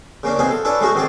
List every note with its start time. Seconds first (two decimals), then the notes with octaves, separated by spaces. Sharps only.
0.23 C#3 A#3 C#4 D4
0.39 B3 C4 D#4 F4 G#4
0.51 A4
0.65 C#4 D4 E4 F4 A4 B4
0.80 G#3 A3 C#4 D#4 F#4 G#4
0.94 B2 D#3 C4 G#4 D5